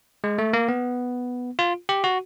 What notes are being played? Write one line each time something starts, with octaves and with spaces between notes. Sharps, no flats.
G#3
A3
A#3
B3
F4
G4
F#4